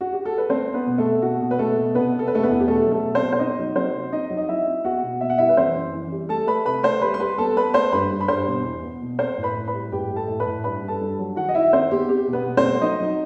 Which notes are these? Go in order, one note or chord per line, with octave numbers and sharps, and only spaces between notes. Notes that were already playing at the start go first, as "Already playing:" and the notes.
F#4
G4
A4
B4
A3 C4 C5
C4
B3 B4
B2
A3 A4
B2
B2 F#4
B2
B4
B2 A3 A4
B2
C3 B3 B4
C3
A4
B4
C3 A3 A4
B3 B4
E2
G4
B2 A3 A4
F#3
A3 A4
B2
C4 C5
B2
C5
C4 D#4 D#5
F#3
F#3 C4 C5
C3
C4 D#4 D#5
F#3
D#5
F#3 E4 E5
C4
B3 F#4 F#5
B2
B2 E5
F#5
G3 E4 E5
B4
E3 C4 C5
F#2
E3
G3
A3 A4 A5
A3 B4 B5
C3 B4 B5
A3 C5 C6
G3 B4 B5
C6
G3 B4 B5
B3 A4 A5
B3 B4 B5
A3 C5 C6
G2 B4 B5
G2
B5
G2 C5 C6
B2
E2
B3
B2
C4 C5 C6
A2
B4 B5
A2
B4 B5
G3
A2 G4 G5
A2
A4 A5
A2
B4 B5
A2
G2 B4 B5
G2
A4 A5
G2
F#3
D#3 F#4 F#5
D#5
D#3 E4 E5
D#3 C4 C5
B3 G4
C4 G4
B2
B3 B4
B2
C4 C5
A3
F#3 D#4 D#5
F#3